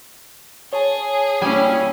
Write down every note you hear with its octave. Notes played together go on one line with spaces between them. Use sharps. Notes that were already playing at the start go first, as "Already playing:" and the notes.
G#4 C#5 A5
G3 A#3 C#4 E4 G#5